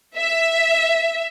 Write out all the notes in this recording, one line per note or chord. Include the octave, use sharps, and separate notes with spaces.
E5